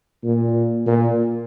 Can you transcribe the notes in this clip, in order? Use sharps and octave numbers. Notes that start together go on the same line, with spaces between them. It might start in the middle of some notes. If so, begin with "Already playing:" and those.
A#2
A#2